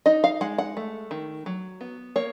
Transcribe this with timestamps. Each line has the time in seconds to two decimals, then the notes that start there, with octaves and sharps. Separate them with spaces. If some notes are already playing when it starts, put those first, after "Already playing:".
0.06 D#4 D#5
0.24 F5
0.41 G#3 F#5
0.58 F#5
0.77 A3
1.11 D#3
1.46 F#3
1.81 B3
2.16 A#3 C#5